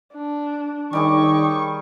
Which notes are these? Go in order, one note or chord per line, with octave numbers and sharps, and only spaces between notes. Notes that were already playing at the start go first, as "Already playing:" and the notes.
D4
D#3 G3 D#4 G#4 C#5 G5 C#6 D6